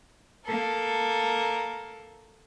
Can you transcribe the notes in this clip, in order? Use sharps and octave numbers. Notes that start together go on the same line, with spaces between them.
A#3 A4 A#4